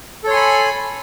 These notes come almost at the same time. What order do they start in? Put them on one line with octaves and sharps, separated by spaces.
A4 C#5 C6 G#5 B5